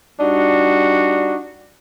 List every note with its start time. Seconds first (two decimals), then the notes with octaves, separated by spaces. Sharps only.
0.20 G3 D4 D#4 F#4